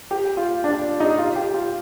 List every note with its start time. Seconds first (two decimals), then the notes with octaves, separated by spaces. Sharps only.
0.11 G4
0.37 F4
0.64 D4
1.00 D#4
1.19 F4
1.36 G4
1.54 F4